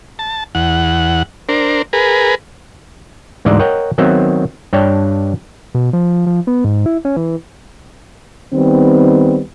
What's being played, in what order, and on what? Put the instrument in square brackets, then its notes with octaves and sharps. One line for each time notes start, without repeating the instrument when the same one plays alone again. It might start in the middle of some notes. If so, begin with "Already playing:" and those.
[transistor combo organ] A5
E2 F#5
D4 A#4 C5
G#4 A#4 B4
[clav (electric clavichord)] D2 G#2 E3 D5 D#5 A#5
A#4 C#5 D#5 F#5 G5
D#3 F#3 B3 C4 E5
G2 D4 C#5 D5 G5
[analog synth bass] B2
F3
F3
B3
G#2
E4
C#4
E3
[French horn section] D#3 G3 B3 C4